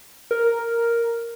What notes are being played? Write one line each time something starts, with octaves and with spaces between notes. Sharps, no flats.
A#4